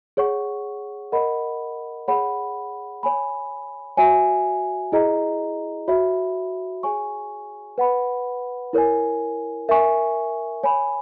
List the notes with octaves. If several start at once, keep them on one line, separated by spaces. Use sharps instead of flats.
G#4 C#5 F#5 C#6
A#4 D#5 F#5 B5
G#4 C#5 F#5 B5
C#5 G#5 B5
F#4 C#5 E5 G#5
E4 G#4 D#5 A#5
F#4 C#5 E5 B5
G#4 C#5 G#5 C#6
B4 F#5 B5
E4 A#4 C#5 G#5
A#4 E5 G#5 C#6
C#5 G#5 B5